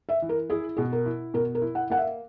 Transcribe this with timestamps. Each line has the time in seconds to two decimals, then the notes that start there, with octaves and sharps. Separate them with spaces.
0.09 E5
0.22 E3
0.29 A#4
0.50 E4 G#4
0.77 B2 G#4
0.92 A#4
1.06 E4
1.34 B2 A#4
1.55 A#4
1.62 E4
1.75 F#5
1.90 A#3 F#5
1.97 E5